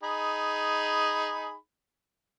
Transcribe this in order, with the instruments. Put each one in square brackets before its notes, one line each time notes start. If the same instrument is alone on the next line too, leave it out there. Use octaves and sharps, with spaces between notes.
[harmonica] D#4 G#4 B5